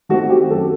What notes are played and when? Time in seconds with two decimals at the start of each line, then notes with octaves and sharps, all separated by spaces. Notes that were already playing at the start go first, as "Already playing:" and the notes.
0.09 D#3 A3 C4 F#4
0.30 G4
0.50 F#2 A4